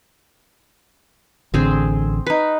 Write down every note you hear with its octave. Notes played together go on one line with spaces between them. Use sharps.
A1 D3 C4 G#4 C5
D#4 B4